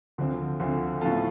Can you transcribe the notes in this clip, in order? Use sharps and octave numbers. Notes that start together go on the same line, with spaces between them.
D2 D3 F3 C4
D2 D3 F3 C4
A2 F3 B3 F4 A4